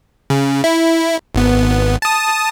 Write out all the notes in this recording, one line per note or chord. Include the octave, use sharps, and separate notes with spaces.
C#3
E4
G#1 B3
A5 D#6